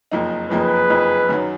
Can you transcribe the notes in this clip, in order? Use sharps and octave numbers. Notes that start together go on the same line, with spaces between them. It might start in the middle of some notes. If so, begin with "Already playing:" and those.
F#1 F2 F3 A#3 D#4
F#1 F2 F3 A#3 D#4 G#4 B4
F#1 F2 F3 A#3 D#4
F#2 D#3 F#3